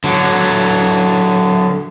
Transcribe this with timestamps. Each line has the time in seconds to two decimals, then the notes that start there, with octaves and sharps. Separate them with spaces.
0.04 D3 F#3